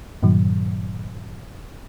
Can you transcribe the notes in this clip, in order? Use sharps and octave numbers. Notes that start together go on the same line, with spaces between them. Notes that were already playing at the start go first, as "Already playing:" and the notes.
G2 A#2 D#3 F#3